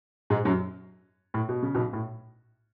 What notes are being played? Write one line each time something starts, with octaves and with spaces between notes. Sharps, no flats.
G#2 G#3
F#2 F#3
A2
B2
C#3
B1 B2
A2